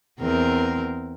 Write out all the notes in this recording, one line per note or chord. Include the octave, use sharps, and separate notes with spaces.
E2 C4 A#4